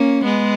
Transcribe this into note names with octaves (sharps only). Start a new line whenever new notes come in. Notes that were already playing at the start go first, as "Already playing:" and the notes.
Already playing: A#3 C#4
G#3 B3